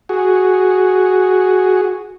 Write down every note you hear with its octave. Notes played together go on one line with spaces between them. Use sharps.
F#4 G#4